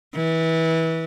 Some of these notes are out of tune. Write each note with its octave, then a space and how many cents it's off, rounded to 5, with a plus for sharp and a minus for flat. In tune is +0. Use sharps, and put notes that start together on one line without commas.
E3 -20